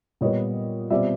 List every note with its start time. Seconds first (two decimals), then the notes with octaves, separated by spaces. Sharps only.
0.21 A#2 G3 B3 C#5 D#5
0.90 B2 G3 C4 F4 D5 E5